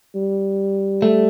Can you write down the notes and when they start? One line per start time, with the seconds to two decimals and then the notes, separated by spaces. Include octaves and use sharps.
0.15 G3
1.02 A3